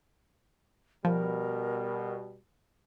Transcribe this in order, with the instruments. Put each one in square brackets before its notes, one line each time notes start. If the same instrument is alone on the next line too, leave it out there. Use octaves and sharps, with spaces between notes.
[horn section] B2 G3 [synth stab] F3 [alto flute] A#4